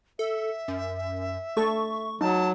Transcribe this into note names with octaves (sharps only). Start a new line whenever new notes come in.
A4 E5
F#2
A3 A4 C#6
F#3 D#4 A5